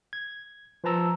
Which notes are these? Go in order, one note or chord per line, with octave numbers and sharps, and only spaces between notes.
G#6
F3 B4 C5 A5 A#5 E6